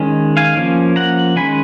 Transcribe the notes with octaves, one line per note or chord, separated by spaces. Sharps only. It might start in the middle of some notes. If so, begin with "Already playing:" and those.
Already playing: D#3 G#3 C#4
F5 G#5
F3 A#3 C#4
F#5 A#5
D#3 G#3 C#4 G#5 B5